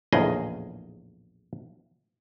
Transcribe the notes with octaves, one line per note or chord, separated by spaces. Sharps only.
A#1 E2 A2 C#3 G#4 D#5